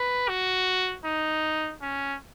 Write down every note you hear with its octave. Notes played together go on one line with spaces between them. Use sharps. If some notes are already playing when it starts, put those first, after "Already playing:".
Already playing: B4
F#4
D#4
C#4